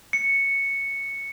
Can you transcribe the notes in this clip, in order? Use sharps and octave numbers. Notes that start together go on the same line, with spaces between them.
C#7